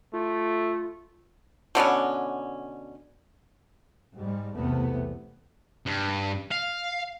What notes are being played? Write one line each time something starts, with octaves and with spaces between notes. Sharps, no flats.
A3 F4
B2 D3 B3 C#4
G#2 G3
B1 E2 C3 A3 B3
G2
F5